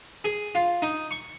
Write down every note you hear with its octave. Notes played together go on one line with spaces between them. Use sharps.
G#4
F4
D#4
C#6